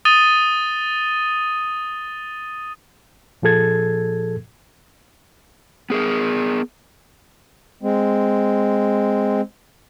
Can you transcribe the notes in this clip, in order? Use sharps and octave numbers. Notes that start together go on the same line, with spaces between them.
D#6 A6 D#7 G7
A#2 F3 G#4 A4 G#6 A6
B3 G#4 A#4
G#3 C4